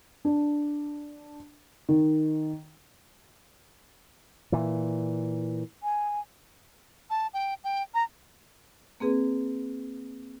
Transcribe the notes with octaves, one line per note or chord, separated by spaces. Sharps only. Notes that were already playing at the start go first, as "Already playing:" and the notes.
D4
D#3
A#2 E3
G#5
A5
G5
G5
A#5
A#3 C4 G#4 B4